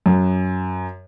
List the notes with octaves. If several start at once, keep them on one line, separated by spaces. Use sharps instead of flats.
F#2